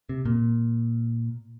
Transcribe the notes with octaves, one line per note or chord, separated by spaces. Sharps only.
C3
A#2